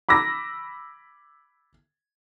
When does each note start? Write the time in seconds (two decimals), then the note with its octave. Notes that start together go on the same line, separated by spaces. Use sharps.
0.09 B5 D6 E6 A#6